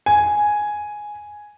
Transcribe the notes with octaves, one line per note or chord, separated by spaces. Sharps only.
G#5